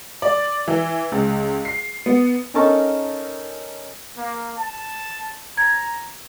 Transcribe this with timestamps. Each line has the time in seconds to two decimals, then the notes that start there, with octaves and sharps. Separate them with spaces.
0.22 D5
0.68 E3
1.12 C#2
1.65 C7
2.06 B3
2.54 C#4 D#4 A4 A#4 A5 C#6
4.17 A#3
4.57 A5
5.57 A#5 G#6